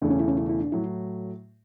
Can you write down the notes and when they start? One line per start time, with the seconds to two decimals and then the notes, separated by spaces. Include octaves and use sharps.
0.02 E1 E2 C#3 E3 A3 D4
0.10 C#4
0.20 E4
0.28 C#4
0.38 E4
0.49 E4
0.61 D4
0.72 A2 F#3 A3 E4